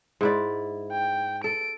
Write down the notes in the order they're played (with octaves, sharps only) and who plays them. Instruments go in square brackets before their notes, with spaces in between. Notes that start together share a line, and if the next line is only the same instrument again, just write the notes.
[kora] G#2 E4 D5
[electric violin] G5
[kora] A4 [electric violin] D7